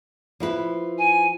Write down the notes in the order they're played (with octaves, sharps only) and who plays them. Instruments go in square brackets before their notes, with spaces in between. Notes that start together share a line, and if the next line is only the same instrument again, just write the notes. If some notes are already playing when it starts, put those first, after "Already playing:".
[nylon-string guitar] F3 E4 B4
[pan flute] G#5